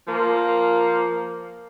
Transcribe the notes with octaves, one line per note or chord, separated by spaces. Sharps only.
F3 A#3